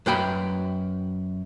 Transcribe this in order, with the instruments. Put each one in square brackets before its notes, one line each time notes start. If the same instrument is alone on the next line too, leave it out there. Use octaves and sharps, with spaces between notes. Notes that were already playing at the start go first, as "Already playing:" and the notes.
[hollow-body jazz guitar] F#2 B4 G5 B5